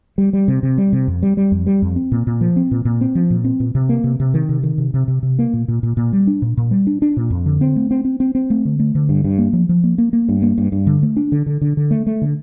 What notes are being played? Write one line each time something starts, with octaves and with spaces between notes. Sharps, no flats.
G3
G3
C3
C3
G3
C3
F2
G3
G3
F2
G3
F2
C4
A#2
A#2
F3
C4
A#2
A#2
C4
F3
A#2
C4
A#2
C3
A#3
C3
C3
D#3
C3
D#3
C3
C3
C3
C3
A#3
A#2
A#2
A#2
A#2
G3
D4
A#2
A#2
G3
D4
D4
A#2
F2
D3
C4
A3
C4
C4
C4
C4
A3
D3
A3
D3
G2
G2
A#3
F3
F3
A#3
A#3
A#3
G2
A#3
G2
G2
D3
A3
D4
D3
D3
D3
D3
A3
A3
D3